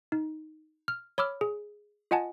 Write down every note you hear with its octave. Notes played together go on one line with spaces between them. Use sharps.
D#4
F6
C#5 B5 D6 E6 F6
G#4
F4 D#5 F#5 G#5 A5